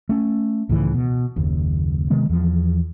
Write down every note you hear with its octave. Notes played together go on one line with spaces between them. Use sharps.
A3 C#4
C#2 A2 D#3 E3
B2
F#1 D#2
C3 D#3 G#3 B3
E2 F3